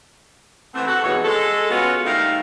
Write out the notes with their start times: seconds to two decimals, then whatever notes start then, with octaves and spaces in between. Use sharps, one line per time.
0.75 E3 A3 B3 C4
0.86 F#4 A4
1.03 D#2 B2 E3 G#3 F#4 C#5
1.24 G#3 A4
1.70 G#3 B3 C#4 F4 F#4
2.05 D#3 G3 A3 A#4 F5